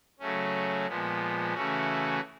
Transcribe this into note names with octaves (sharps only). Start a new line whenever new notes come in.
C#3 F#3 A3 C#4
A#2 F3 G#3 B3
C#3 E3 A3 C#4 F#4